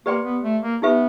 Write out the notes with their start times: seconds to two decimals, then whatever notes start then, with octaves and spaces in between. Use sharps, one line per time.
0.06 A#3 G4 B4 D5 G5 C6
0.24 B3
0.44 A3
0.62 A#3
0.82 B3 D#4 G4 B4 E5